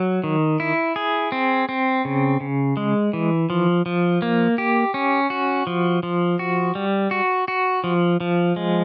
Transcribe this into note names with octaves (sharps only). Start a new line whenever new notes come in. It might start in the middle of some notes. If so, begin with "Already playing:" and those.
Already playing: F#3
D#3
E4
G#4
C4
C4
C#3
C#3
G#3
E3
F3
F3
A#3
G4
C#4
F#4
F3
F3
F#4
G3
F#4
F#4
F3
F3
G#3